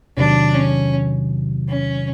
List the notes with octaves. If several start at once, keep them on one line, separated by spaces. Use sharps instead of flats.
E2 C3 D#3 F#3 D4
C#4
C#4